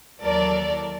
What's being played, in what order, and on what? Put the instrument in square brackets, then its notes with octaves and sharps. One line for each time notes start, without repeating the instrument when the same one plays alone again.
[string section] D#2 E3 F#3 A4 A#4 D5